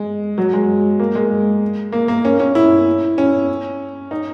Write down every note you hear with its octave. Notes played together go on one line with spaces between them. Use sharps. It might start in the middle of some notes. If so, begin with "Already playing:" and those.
Already playing: G#3
F#3
G#3
A#3
G#3
A#3
A#3
C#4
C#4
E4
C#4
D#4